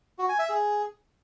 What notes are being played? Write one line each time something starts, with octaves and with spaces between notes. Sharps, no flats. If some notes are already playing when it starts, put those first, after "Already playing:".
F#4
G#5
E5
G#4